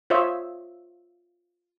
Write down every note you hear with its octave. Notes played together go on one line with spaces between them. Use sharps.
F4 C5 C#5 D#5 E5